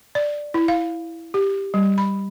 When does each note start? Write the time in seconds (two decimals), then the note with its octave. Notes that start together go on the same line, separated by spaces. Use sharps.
0.15 D5
0.54 E4
0.68 F5
1.34 G4
1.74 G3
1.98 B5